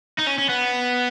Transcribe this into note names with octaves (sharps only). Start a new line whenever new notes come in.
D#4
C#4
C#4
B3